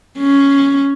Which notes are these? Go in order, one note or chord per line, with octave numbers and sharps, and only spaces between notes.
C#4